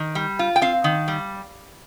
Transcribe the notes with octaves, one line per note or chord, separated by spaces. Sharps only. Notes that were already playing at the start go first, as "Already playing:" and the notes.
Already playing: D#3
G3
F4
G5
C4 F5
D#3
G3